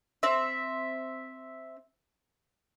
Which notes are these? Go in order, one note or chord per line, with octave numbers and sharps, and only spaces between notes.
C4 E5